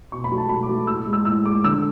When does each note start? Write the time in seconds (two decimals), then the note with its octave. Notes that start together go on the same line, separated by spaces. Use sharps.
0.12 B2 C#6
0.24 B5
0.31 F#3 A3
0.38 A5
0.49 B2 B5
0.63 D6
0.69 F#3 A3
0.87 A2 E6
1.06 G#3
1.13 E6
1.25 A2 E6
1.45 G#3 D6
1.64 D3 E6